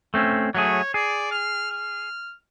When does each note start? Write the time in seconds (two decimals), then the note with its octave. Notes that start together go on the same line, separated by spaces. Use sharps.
0.14 A3 C4 C#4
0.55 F#3 A3 G#4 C#5
0.94 G#4 D5
1.32 F6
1.71 F6